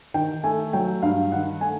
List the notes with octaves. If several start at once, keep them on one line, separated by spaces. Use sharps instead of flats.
D#3 G5
A3 G#5
F#3 G5
G2 F5
D#3 F#5
A3 G#5